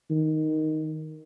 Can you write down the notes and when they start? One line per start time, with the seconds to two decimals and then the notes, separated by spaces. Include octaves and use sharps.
0.11 D#3